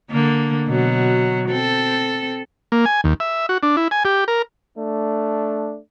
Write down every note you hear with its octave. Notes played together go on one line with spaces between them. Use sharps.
D3 A#3
B2 F#3
C4 A4
A#3
G#5
D#2
E5
F#4
D4
E4
G#5
G4
A#4
A3 D4